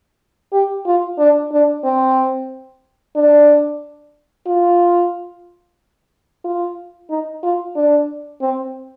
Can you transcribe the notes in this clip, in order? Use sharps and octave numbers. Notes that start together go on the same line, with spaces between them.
G4
F4
D4
D4
C4
D4
F4
F4
D#4
F4
D4
C4